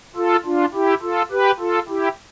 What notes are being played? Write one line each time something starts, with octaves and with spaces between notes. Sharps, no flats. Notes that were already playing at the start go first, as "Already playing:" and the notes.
F4 A4
D4 F4
E4 G4
F4 A4
G4 B4
F4 A4
E4 G4